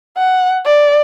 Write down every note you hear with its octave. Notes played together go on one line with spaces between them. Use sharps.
F#5
D5